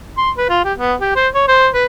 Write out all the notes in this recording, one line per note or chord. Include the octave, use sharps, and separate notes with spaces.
C6
B4
F4
G4
B3
G4
C5
C#5
C5
B4